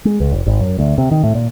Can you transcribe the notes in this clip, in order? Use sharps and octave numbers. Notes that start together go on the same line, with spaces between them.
G#3
C#2
F1
G#1
F#2
D2
C3
D#3
A2
A#2